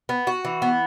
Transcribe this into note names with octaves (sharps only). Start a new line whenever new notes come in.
B3
F#4
E3
B3